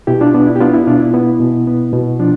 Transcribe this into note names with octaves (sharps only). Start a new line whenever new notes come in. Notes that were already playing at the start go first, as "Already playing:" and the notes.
B2 E4 G4
D4 F4
B3 D4
E4
G4
B3 D4 F4
E4
B2 D4 F4
E4
B3 E4
B2
B3
B2
F3 D4 F4